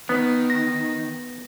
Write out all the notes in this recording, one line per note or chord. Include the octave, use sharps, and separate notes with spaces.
D#3 B3
A#6